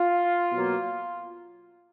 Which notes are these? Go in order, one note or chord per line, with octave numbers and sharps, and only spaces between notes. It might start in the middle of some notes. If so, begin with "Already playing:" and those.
Already playing: F4
B2 F#3 A#3